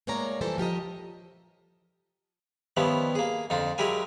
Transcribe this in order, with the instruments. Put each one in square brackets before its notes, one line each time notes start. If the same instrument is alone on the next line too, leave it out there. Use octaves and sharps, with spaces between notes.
[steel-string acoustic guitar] A2 G#3 A#3 C#5 D5 A#5
F2 E3 G3 A4 C5 A5
F3 G4 A#4 D#5
[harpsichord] D#3 F3 G3 B3 C#4 E4
A#3 G#4
F2 D3 D#4 F4
F#3 G#3 E4 G4 A#4 G#5